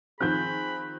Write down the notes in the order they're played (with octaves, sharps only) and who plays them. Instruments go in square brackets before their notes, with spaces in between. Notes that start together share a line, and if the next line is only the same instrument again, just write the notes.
[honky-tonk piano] D#3 F3 C4 [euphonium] G#4 [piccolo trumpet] B5 [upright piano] F#6 G6